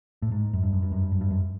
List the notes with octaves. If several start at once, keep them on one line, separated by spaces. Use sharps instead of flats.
A2
G#2
F#2
G2
F#2
G2
F#2
G2
F#2
G2
F#2